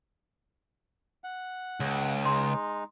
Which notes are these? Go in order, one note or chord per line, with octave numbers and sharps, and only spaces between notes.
F#5
C#2
G#3 D#4 C6